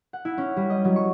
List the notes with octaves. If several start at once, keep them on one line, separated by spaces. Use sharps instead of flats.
F#5
E4
C#4
G3
D#5
F#3
C#6